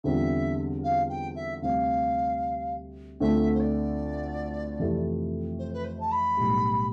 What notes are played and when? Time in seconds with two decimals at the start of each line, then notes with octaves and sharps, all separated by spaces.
0.04 E2 D3 G3 C4 F4 E5
0.83 F5
1.09 G5
1.35 E5
1.62 D2 C3 G3 C4 F5
3.20 D2 D3 A3 C4 F4 E5
3.54 C5
3.60 D5
4.80 F2 C3 E3 A3
5.58 C5
5.73 B4
5.84 C5
6.00 A5
6.11 B5
6.37 B1 A2 G3